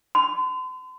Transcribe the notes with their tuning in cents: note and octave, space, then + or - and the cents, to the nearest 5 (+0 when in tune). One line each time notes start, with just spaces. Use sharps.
C6 -40